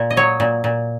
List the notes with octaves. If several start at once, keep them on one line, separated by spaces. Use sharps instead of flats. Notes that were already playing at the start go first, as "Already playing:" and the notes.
Already playing: A#2
D#5
F#3 C#5
A#2
A#2